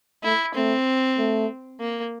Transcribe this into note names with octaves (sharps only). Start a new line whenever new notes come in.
A3 E4
A3 C4
A3
A#3